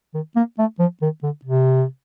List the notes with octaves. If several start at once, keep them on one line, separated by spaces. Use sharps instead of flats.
D#3
A#3
A3
F3
D#3
D3
C3